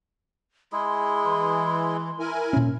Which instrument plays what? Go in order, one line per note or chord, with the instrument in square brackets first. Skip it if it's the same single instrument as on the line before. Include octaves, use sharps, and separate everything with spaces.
[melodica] G#3 E4 G#4 [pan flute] C6
[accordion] E3
E4 A#4 G#5
[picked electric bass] A#2 C#4